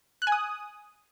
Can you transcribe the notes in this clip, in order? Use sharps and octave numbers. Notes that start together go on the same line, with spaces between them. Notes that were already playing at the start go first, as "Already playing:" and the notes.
F#6
G#5
D#6